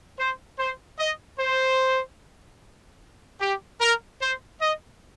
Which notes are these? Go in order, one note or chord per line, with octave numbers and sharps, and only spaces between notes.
C5
C5
D#5
C5
G4
A#4
C5
D#5